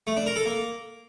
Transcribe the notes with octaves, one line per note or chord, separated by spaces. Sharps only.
A3
D4
A#4
A4
A#3